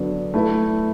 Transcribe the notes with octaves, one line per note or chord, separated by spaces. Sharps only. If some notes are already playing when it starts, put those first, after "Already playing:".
Already playing: D3 F#3 B3 D4 A4
A3 E4 B4 E5